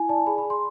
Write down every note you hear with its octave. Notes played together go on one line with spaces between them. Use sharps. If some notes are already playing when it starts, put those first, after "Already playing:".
Already playing: E4 G#5
D5 A5
G#4 B5
B5
G#4
C6